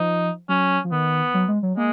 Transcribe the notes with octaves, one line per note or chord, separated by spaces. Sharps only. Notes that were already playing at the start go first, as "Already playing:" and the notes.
Already playing: F3 D#4
F#3 C#4
F3
D#3 B3
F#3
G#3
F#3
G#3 A#3